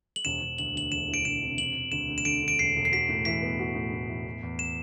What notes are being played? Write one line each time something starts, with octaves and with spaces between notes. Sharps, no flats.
F#7
E1 E7
E1
D2 F#7
D2 F#7
E1 E7
E3 D7
E1 E7
C3
E1 F#7
E1
D2 E7
D2
E7
D3 D7
D3
D7
E1 C7
E1
C7
F#4 B6
A2
E3 B6
B3
F#4
A2
A2
E3
E2
E2
E7